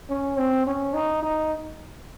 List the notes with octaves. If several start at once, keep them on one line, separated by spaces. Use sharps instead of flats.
C#4
C4
C#4
D#4
D#4